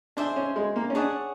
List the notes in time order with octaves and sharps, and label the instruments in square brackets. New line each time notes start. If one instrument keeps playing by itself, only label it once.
[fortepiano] D4 [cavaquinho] G#4 C5 E5
[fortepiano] C#4
G#3
A#3
C#4
[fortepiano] D4 [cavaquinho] G#4 C#5 F#5